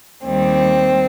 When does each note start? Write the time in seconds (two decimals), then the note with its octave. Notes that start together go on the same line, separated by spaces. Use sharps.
0.24 D#2 D#3 G3 C4